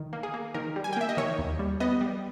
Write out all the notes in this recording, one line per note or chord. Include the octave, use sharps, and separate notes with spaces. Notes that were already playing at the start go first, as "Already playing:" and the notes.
Already playing: D#3
A#3
G#4
A#3
D#3 A#4
G3
G#5
G5
A#3 E5
D#5
D#3 C#5
D#2
G3
B3 D#5
G3